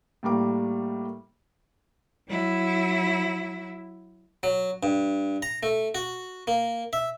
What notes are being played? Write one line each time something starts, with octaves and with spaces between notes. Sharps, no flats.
A2 G3 A#3 D6
F#3 E4
F#3
G2
A#5
A3
F#4
A#3
E5